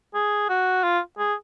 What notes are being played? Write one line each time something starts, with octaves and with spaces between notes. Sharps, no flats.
G#4
F#4
F4
G#4